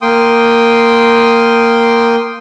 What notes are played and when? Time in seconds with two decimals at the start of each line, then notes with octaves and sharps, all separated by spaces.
0.02 A#3 G5 C6 D#6